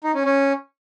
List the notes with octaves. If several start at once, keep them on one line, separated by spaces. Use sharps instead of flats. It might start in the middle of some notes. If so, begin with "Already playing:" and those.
D#4
C#4
C#4